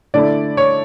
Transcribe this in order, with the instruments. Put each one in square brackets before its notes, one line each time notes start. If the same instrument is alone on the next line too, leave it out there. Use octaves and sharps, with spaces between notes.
[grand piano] D3 A3 E4 D5
C#5